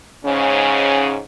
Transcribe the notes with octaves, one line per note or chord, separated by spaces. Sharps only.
G#2 C#3 C#4